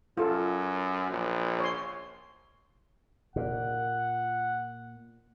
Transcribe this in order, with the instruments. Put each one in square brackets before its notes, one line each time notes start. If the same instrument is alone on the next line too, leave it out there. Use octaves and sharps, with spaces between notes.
[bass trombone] F#2 [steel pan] F4 A4
[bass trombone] A#1
[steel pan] C#5 C6
[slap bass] A#2 [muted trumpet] F#5